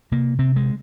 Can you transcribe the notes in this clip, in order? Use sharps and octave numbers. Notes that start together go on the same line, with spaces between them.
C3 A#3
C3 C4
G#3